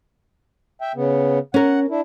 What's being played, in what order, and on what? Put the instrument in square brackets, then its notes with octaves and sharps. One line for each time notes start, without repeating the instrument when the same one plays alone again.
[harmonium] E5 G5
C#3 B3
[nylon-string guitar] C#4 A#4 [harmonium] F#5
[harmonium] D4 E4